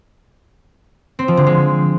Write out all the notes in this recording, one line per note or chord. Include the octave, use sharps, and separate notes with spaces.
C4
F3
D3
G#3